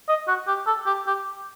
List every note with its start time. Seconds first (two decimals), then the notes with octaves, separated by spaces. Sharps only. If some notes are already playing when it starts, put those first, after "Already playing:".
0.09 D#5
0.28 F#4
0.48 G4
0.66 A4
0.86 G4
1.07 G4